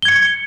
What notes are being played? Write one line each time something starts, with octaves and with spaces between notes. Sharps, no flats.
G#6 C#7 G7